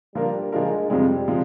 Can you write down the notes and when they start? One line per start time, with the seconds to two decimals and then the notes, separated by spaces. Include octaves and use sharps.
0.15 F3 G3 A#3 D4 F4 A#4
0.52 F3 G#3 A#3 D4 F4 A#4
0.89 F2 C3 F3 G3 G#3
1.28 C3 F3 G#3